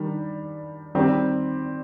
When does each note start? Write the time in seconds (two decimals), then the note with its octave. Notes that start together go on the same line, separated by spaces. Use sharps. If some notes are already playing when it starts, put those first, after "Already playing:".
Already playing: D#3 G3 D4
0.95 D#3 G3 C4 G4